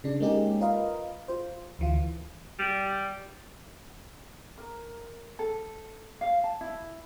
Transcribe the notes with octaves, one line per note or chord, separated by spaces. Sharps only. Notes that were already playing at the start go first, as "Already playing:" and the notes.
C#3 D4
G#3 A#3 C#4 D#4 G4 G#4
F4 A#4 B4 D#5 F5
F4 C5
D2 E3 F4
G3
A#4
A4
F5
A5
E4